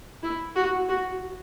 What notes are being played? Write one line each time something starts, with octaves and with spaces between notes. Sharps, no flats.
E4
F#4
F#4